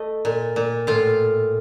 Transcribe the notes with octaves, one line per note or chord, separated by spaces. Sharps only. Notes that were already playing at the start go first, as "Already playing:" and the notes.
Already playing: A3 D#5
A#2
A#2
A2 F4 F5